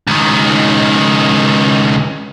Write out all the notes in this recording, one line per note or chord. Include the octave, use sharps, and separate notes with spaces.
C#2 D#3